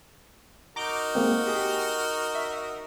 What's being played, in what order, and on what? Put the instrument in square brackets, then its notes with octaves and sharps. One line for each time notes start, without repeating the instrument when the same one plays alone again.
[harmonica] D#4 F#4 A#4 [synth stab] A#5 D6 G6
[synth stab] G#3 A#3 C4
G4 G#4
E5